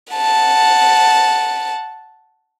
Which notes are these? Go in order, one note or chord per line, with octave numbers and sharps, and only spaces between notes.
F#5 A5